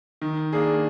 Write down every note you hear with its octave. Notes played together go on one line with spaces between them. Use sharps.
D#3
A#3 D4 G#4